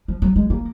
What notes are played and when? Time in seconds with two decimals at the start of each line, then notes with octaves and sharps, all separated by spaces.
0.08 F3
0.22 F#3
0.36 G#3
0.50 A#3